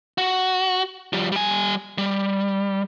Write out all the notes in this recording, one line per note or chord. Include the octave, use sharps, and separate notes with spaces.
F#4
F3 G3
G3 G#5
G3